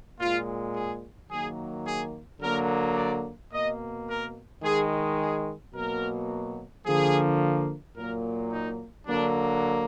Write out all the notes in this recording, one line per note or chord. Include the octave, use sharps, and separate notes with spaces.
A#2 G#3 F4
G#4
D#3 F#3 A#3 G#4
G#4
D3 F#3 A#3 A#4
D5
B2 A#3 D#5
A#4
D#3 G#3 G#4
G#4
B2 F#3 A#3 A#4
D3 F3 A#3 G#4
A#2 F#3 A#3 A#4
D#4
D3 F#3 A#3 D4